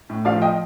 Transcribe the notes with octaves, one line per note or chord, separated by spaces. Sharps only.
A2
F3 D5 F5
D#5 G5